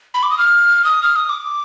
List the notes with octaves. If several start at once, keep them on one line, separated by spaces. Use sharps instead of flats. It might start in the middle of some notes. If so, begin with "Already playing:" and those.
B5
D6
D#6
F6
D#6
F6
D#6
D6